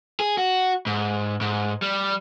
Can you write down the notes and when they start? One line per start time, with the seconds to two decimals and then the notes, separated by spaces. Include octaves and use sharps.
0.20 G#4
0.38 F#4
0.86 G#2
1.41 G#2
1.82 G3